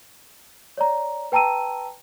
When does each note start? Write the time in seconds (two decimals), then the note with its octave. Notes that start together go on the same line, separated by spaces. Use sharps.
0.77 C#5 D5 A#5
1.32 B4 G5 A5 A#5 E6 D#7